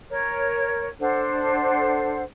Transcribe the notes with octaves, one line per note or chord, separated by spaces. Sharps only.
A#4 C#5
D4 A4 C5 F#5